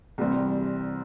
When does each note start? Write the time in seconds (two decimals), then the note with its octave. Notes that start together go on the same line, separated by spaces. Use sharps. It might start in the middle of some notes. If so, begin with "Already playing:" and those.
0.18 C2 C3 E3 G3 C4